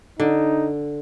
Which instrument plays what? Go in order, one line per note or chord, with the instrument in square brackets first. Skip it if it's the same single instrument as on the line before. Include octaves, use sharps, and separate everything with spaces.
[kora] D3 [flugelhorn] D#4